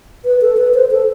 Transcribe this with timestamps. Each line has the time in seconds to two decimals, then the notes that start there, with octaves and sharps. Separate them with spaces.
0.25 B4
0.41 A4
0.57 B4
0.74 C5
0.91 A4